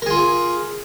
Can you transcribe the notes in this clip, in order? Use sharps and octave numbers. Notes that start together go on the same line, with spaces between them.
F4 G#4 A#4